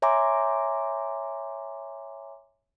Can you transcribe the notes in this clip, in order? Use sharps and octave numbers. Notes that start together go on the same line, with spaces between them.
C#5 E5 G#5 A#5 C6 D6